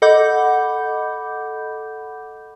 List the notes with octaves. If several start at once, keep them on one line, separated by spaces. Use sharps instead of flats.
A4 D#5 F#5 B5 D6 G6